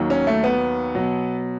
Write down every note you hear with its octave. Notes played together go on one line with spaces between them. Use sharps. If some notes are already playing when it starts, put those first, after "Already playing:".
Already playing: D#2 D#3 F#3
C#4
A3
B3
B2 F#3